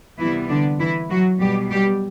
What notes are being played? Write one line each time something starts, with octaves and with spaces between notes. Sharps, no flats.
C3 E3 G3 B3 E4
D3 D4
E3 E4
F#3 F#4
B2 F#3 G3 B3 G4
G3 G4